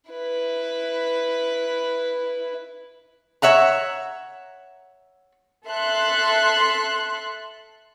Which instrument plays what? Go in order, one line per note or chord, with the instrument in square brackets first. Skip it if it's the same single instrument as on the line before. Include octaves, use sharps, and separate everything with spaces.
[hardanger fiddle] E4 B4
[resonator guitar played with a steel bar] C#5 E5 F#5 A#5
[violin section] A4 E5 C6 F#6